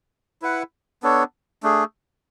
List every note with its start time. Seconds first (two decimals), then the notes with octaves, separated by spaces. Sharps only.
0.42 E4 B4 F#5
1.03 B3 D4 A4 C#5
1.63 A3 D4 G#4